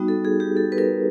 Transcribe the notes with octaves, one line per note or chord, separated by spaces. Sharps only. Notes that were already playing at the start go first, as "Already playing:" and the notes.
Already playing: G3 B3 D#4 F#4
A4
G#4
G4
A4
B4
A#4